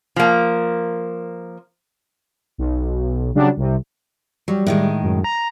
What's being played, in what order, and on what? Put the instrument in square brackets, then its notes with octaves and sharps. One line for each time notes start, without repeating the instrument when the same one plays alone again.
[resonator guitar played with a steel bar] F3 A#3
[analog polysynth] B1
C#3 F#3 G3 D4
C2 C3
[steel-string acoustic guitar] F#3 [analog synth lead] G3
[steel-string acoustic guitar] A2 D#3 G#3
[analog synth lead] F#2
A#5